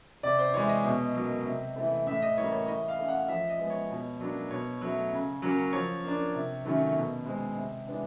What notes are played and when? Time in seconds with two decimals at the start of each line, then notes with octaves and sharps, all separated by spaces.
0.23 C3 D5
0.39 C5
0.54 E3 G#3 C#5
0.69 D#5
0.84 B2
1.15 F#3 A#3
1.45 C3
1.76 E3 A3
2.07 A2 E5
2.22 D#5
2.37 E3 G3 A#3 C#5
2.52 C#5
2.68 E3 D#5
2.88 F5
2.99 A3 C#4
3.08 F#5
3.28 F3 E5
3.49 D#5
3.59 G#3 B3
3.70 C#5
3.90 B2
4.21 F#3 A#3 D4
4.51 B2 C#5
4.81 F#3 A3
5.11 C#3
5.42 F#3 A#3 C#4
5.73 F3 C#5
6.04 A#3 D4
6.34 C3
6.65 D#3 F#3 A3 C#4
6.95 B2
7.26 G#3 C4
7.57 C3
7.87 E3 G#3 B3 D4